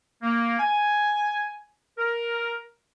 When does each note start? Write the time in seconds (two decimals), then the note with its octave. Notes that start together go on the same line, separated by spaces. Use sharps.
0.23 A#3
0.59 G#5
1.98 A#4